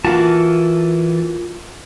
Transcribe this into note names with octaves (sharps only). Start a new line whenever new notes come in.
E3 A#3 F4 F#4 A5